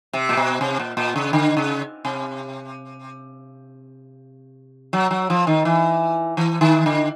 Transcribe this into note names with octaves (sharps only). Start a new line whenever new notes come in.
C3
A#2
B2
C3
A#2
A#2
C#3
D3
C#3
C3
F#3
F#3
F3
D#3
E3
E3
D#3
D3